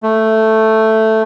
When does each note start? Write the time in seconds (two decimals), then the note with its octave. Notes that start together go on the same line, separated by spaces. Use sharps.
0.03 A3